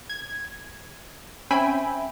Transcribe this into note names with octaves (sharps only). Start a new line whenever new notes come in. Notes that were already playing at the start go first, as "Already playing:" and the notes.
G#6
C4 C#4 E5 G5 G#5 B5